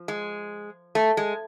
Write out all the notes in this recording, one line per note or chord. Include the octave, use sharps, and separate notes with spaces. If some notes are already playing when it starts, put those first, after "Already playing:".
Already playing: F3
G#3
A3
G#3